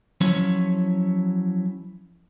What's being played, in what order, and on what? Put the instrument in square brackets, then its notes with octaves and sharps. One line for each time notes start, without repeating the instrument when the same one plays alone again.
[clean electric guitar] F3 F#3 C#4 E4 C#5